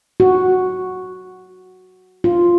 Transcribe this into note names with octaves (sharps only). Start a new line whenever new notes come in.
F#4
F4